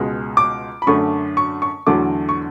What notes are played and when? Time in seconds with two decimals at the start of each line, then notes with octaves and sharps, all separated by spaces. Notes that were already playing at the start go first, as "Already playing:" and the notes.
Already playing: C#2 B2 G#3
0.37 D6
0.82 B5
0.87 F#2 D3 A3 C#6
1.37 C#6
1.62 C#6
1.87 E2 D3 F#3 A3 D6
2.29 C#6